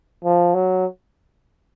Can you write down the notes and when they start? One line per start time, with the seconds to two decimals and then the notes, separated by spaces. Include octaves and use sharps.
0.24 F3
0.54 F#3